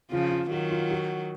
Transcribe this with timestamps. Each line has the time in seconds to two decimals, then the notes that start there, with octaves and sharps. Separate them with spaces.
0.11 C#3 F3 F4
0.31 F4
0.50 D#3 F#3 F#4
0.70 F4
0.90 F#4